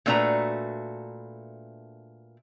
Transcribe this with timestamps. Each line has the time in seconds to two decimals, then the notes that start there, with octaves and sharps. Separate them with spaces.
0.06 A#2 A3 D4 F#4 B4 A#5